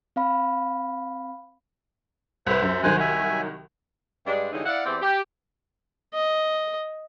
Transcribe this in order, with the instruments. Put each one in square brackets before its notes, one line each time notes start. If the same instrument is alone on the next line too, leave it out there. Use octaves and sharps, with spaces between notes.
[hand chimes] C4 F5 B5
[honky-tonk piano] C2 B4 [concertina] C5 E5
[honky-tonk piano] F#2
[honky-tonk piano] C2 D#3 F#3 [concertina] C5 G#5 F#6
[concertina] E5 G#5
[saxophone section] G2 G#3 D4
G2 D3 E3 G#3 C#4 D#4
E4 D5 F5 F#5
E2 E3 C4 G4 D5
G4
[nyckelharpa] D#5